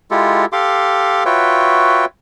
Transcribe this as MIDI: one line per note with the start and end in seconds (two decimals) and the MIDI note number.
0.11 0.45 56
0.11 0.45 64
0.11 0.45 65
0.11 0.45 67
0.11 0.45 69
0.53 1.24 67
0.53 1.24 69
0.53 1.24 77
0.53 1.24 84
0.53 1.24 86
1.26 2.05 65
1.26 2.05 66
1.26 2.05 71
1.26 2.05 73
1.26 2.05 76
1.26 2.05 79